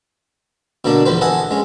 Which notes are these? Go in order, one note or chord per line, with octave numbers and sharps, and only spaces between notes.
B2 D3 A#3 D4
E2 F3 B4 C5
A4 D#5 F#5 G#5
G#3 C#4